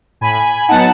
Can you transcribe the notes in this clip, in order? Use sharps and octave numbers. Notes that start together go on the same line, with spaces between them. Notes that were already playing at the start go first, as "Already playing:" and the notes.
A2 G#5 B5
F#3 B3 D#4 F#5 A5